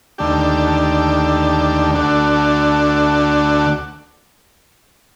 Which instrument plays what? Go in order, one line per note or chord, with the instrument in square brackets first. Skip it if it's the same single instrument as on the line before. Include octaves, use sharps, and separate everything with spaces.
[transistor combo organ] D#2 D3 A3 D4 G4
D2 D3 A3 D4 F#4